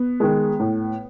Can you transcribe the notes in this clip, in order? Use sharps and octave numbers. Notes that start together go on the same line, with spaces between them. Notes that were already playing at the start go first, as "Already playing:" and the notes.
Already playing: B3
D#3 G#3
A2